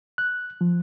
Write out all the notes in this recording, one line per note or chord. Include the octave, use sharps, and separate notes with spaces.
F#6
F3